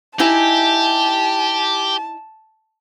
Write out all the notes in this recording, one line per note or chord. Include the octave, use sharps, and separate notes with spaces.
D#4 E4 G4 G#5 A5